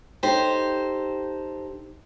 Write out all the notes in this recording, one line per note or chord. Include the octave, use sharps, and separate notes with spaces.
D#4 G4 A4 C5